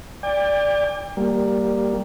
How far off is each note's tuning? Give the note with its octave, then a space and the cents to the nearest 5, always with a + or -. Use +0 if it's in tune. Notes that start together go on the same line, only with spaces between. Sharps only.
D5 +0 G5 +40
G3 +0 A#3 +0